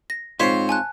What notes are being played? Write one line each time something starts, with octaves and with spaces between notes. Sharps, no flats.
A#6
G#2 C4 F4 C5 C#5 B6 C7
G#5 A5 F#6